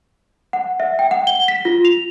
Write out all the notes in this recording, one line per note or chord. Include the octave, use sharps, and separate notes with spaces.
F#5
E5
G5
F#5
G7
B6
F4
F7